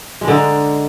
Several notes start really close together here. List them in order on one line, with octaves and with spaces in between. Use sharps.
G#3 D4 D3 D#4